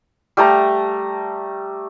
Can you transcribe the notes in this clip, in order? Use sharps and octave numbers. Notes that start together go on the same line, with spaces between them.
G3 A3 A5 A#5